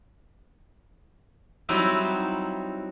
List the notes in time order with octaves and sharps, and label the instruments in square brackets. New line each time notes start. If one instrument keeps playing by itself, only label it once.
[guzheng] F#3 G3 C4 D#4 E4